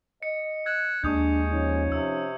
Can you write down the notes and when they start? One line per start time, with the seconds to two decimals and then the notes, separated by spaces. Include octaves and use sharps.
0.23 D#5 C#7
0.66 E6 F#6 G#6
1.04 D#2 G#3 D4 C#6 D#6 G6
1.52 F3 C#4 D#4
1.92 C3 E6